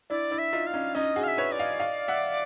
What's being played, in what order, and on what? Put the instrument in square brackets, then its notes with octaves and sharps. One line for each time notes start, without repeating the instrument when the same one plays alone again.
[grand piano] D4 E4 [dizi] D5
[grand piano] D4 E4
[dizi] E5
[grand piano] D#4 F4
[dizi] F5
[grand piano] C#4 D#4
[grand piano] C#4 D#4 [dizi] D#5
[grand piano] F#4 G#4
[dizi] F5
E5
[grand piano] B4 C#5
[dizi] D5
[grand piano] D#5 F5
D#5 F5
E5 F#5